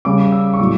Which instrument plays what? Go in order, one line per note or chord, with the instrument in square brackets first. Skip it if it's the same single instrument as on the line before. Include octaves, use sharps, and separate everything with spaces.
[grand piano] C#3 G3 D6
E6
C#6
A2 F#3 D6